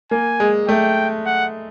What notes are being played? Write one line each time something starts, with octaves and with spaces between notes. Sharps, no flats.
A#3 G#5
G#3
A3 G5
F#5